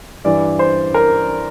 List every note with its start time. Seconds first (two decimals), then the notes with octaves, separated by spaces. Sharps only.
0.25 G2 E3 D5
0.59 C5
0.94 A#4